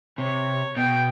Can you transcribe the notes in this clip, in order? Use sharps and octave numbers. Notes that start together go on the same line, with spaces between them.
C3 C#5
B2 G5